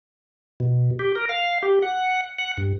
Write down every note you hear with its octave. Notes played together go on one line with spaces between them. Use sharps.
B2
G4
A#4
F5
G4
F#5
F#5
G2